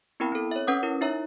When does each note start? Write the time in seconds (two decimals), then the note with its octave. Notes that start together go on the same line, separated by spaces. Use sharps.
0.20 B3 C4 E4 A#4 G5 B5
0.32 C4 A4
0.51 C#5 E5
0.67 C#4 B4 F#5 D6 D#6
0.83 E4 A#4
1.01 D#4 E4 C#5 E5 A#5